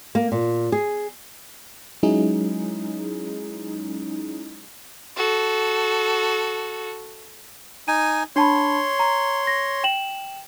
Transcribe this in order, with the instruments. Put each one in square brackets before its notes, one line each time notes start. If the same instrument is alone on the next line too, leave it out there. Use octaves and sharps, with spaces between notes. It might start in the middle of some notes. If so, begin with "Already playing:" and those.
[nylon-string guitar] A#3
A#2
G#4
[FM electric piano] F#3 G#3 C#4 D#4 E4 G#4
[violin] F#4 A4
[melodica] D#4 G#5 [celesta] D#7
[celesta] D4 A5 B5 [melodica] C#5 C6
[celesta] A#5
A#6
G5 E7 F#7